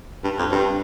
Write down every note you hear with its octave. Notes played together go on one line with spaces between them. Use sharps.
G2
F2
G2